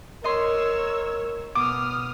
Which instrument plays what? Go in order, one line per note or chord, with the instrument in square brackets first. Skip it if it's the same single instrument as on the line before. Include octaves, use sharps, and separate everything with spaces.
[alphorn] A#4 [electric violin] C#5 E6 [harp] D#5 C6
[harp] B2 [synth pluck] D6 [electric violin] D#6 F6